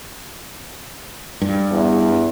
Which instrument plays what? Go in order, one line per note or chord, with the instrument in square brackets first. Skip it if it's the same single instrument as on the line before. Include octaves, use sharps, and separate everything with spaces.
[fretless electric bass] G2
[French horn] E2